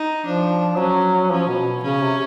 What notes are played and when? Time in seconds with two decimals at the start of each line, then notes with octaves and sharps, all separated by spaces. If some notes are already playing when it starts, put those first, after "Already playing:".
Already playing: D#4
0.26 F3 D4
0.78 F#3 C#4
1.31 F3 C#4
1.48 B2
1.83 C#3 C#4
2.01 C3